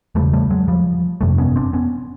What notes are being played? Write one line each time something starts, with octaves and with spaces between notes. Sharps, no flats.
E1 E2 C#3 G3 A3
G3 A3
F#3 G#3
F3 G3
G1 F2 C3 G3 A3
B3 C#4
C4 D4
B3 C#4